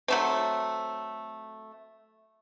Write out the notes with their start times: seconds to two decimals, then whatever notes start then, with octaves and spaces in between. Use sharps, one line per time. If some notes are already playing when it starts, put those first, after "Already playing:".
0.08 F#3 A3 C4